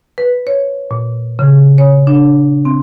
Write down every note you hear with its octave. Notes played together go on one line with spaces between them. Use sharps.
B4
C#5
A#2
C#3
C#5
D4
C4